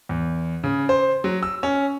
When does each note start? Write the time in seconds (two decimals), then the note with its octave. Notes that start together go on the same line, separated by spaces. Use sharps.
0.09 E2
0.64 C#3
0.89 C5
1.24 F#3
1.43 E6
1.63 C#4